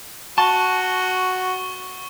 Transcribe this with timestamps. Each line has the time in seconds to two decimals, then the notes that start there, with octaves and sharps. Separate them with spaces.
0.38 F#4 A5 C#6 G7